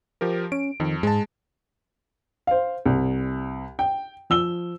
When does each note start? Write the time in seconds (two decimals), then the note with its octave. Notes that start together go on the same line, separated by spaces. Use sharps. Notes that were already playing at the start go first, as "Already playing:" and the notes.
0.21 F3 G4 A#4
0.52 C#4 D7
0.80 F2 D#3
1.03 G#2 G#3 A5
2.47 C5 F5
2.86 C2
3.79 G5
4.30 F3 E6 G7